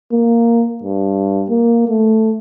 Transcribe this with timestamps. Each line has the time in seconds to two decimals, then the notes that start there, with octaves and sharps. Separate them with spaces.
0.12 A#3
0.83 G2
1.50 A#3
1.88 A3